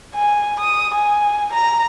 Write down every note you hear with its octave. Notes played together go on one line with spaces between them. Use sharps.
G#5
D#6
G#5
A#5